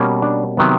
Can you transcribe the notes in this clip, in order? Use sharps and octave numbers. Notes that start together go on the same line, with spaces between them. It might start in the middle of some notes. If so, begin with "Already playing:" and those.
Already playing: B2 G3 A#3 C#4
D4
C3 D#3 F#3 B3